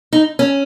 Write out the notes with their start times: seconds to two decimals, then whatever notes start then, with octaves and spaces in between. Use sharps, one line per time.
0.13 D#4
0.39 C#4